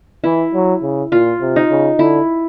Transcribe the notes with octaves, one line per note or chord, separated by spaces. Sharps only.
E3 E4
F#3
C#3
A#2 F4
C3
D#4
C#3
D3 E4